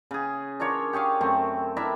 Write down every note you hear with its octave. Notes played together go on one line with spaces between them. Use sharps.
C#3 G#4
D4 F4 A#4 C#5
G4 G#4 C#5 F5
F#2 A3 C4
D4 E4 A#4 E5